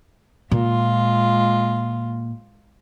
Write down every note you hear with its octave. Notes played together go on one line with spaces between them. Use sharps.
A#2 G#3 F4